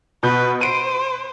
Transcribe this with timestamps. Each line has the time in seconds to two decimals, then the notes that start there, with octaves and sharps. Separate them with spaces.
0.23 B2 B4 G6
0.61 C5 C7 D7 D#7